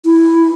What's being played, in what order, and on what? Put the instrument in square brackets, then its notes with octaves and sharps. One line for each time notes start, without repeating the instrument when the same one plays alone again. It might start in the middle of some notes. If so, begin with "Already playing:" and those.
[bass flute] E4